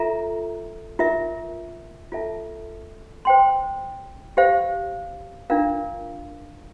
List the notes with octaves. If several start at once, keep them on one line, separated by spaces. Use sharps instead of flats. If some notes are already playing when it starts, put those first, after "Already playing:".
Already playing: F4 A4 E5 A#5
F4 A#4 E5
F4 A4 E5 A5
C5 G5 C6
G4 C5 F5
D4 F4 A#4 F5